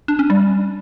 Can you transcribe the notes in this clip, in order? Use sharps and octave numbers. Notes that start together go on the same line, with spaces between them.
D4
C#4
G3